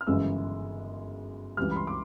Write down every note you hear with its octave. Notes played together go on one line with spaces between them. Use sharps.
F6
G1 F#2 C#3 E3 G#3 E6
C#2 C#3 E3 G3 F6
B5
C6
D6